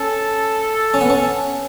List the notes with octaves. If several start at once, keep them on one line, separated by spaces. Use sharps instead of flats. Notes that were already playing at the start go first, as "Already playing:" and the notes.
Already playing: C#4 A4
C#4
B3
C#4